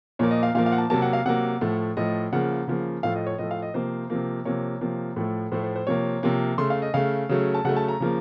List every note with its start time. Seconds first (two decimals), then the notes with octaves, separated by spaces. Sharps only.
0.19 A#2 F3 A#3 C#5
0.31 D#5
0.43 F5
0.55 A#2 F3 A#3 F5
0.66 F5
0.72 F#5
0.78 A5
0.90 C3 F#3 A#3 A5
1.02 F#5
1.13 F5
1.25 C3 F#3 A#3 F#5
1.61 A2 F3 A3
1.97 A2 F3 A3 D#5
2.33 C#3 F3 A#3 F#5
2.68 C#3 F3 A#3
3.03 A2 F3 A3 F5
3.16 D#5
3.27 C#5
3.38 A2 F3 A3 D#5
3.51 F5
3.62 D#5
3.74 C3 F3 A#3 C5
4.10 C3 F3 A#3
4.45 C3 F3 A#3 C#5
4.81 C3 F3 A#3
5.16 A2 F3 A3
5.52 A2 F3 A3 C5
5.64 C5
5.76 C5
5.87 C3 F3 A#3 C#5
6.23 C3 F3 A#3
6.58 C#3 A3 C6
6.70 F5
6.82 D#5
6.94 C#3 A3 F5
7.29 C#3 F#3 A3
7.54 A5
7.65 C#3 F#3 A3 F#5
7.77 A5
7.88 A#5
8.00 C#3 F3 A#3